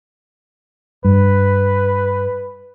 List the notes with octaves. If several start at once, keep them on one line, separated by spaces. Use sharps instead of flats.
G2 B4